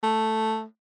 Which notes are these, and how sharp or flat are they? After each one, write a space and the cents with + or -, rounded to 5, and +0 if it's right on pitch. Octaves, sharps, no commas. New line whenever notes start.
A3 +0